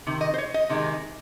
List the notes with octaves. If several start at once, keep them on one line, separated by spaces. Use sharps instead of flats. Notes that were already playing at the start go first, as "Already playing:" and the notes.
C3 D#3
D#5
C5
C#5
D#5
C3 D#3 G#3 D#4